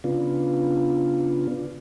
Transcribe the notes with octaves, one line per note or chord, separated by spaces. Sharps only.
C#3 B3 D4 F4